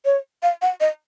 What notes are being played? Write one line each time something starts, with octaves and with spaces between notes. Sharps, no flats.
C#5
F5
F#5
D#5